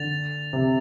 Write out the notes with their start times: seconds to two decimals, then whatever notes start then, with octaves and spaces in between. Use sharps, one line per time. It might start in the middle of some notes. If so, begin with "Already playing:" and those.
Already playing: D3 A6 F7
0.53 C3